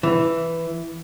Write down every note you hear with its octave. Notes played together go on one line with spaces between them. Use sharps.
E3